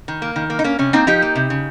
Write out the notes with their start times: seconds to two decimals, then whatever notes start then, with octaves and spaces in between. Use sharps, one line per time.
0.08 D#3
0.22 A#3
0.36 D#3
0.50 A#3
0.59 D#4
0.64 A#3 C#4
0.79 C3 C#4
0.93 A#3 C4 D#4
1.07 F3 D#4 G4
1.22 A#3
1.36 C3
1.50 C#3